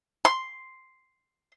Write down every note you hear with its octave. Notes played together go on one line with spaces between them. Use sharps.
C6